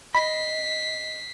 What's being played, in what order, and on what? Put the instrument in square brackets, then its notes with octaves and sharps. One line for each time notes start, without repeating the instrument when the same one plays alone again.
[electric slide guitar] D#5 [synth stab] B5 [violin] B6 C7